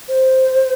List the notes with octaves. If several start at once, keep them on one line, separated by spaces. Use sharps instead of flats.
C5